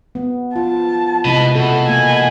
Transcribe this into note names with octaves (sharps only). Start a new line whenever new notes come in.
B3
F4 A5
C3 G#3 E4 B4 D#5
B2 A4
A#3 G#5